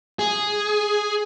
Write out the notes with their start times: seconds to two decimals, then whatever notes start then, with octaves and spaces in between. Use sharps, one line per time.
0.19 G#4